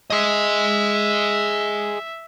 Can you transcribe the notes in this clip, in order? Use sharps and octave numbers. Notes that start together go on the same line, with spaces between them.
G#4 D#5 E5